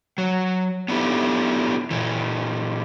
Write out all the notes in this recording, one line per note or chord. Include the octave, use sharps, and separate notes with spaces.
F#3
B3 D4 E4 G4 A4
A#2 E3